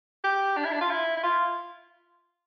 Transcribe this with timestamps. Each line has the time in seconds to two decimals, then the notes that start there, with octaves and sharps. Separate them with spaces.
0.24 G4
0.57 D4
0.65 E4
0.72 D4
0.81 F4
0.91 E4
1.17 E4
1.23 F4